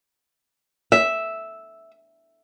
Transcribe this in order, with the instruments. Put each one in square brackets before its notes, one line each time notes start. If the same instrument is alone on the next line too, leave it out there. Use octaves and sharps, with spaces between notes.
[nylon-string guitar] E5